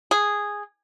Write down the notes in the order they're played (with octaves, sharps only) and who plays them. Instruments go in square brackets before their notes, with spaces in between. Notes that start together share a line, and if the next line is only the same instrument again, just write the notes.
[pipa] G#4